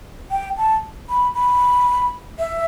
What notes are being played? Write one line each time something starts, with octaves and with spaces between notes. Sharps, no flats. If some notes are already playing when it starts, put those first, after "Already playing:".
G5
A5
B5
B5
E5